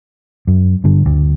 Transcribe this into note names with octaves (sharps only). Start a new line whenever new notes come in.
F#2
G2 D3
D2